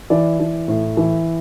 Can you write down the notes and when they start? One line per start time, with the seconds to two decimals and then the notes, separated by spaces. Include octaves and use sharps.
0.10 E3 D5
0.39 E3
0.68 A2
0.97 E3